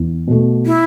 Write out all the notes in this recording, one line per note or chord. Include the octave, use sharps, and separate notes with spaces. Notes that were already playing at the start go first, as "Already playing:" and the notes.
Already playing: E2
B2 A3
E4